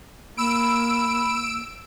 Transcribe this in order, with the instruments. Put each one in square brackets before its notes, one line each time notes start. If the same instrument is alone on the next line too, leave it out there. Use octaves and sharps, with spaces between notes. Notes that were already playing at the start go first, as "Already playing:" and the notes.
[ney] A#3 [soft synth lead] B5 [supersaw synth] E6 D7